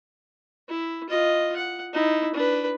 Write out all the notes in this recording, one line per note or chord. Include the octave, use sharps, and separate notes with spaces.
E4
F4 D#5
F#5
D#4 E4
D4 B4